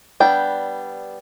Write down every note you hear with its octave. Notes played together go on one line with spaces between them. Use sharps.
G3 B3 D4 G5